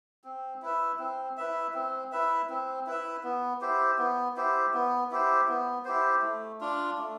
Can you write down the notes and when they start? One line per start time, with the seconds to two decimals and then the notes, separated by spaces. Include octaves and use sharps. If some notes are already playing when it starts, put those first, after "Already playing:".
0.24 C4
0.62 E4 B4 E5
0.99 C4
1.37 E4 B4 E5
1.74 C4
2.12 E4 B4 E5
2.50 C4
2.87 E4 B4 E5
3.24 B3
3.61 E4 G4 C5
3.99 B3
4.36 E4 G4 C5
4.74 B3
5.11 E4 G4 C5
5.49 B3
5.85 E4 G4 C5
6.22 A3
6.61 D4 F4
6.98 A3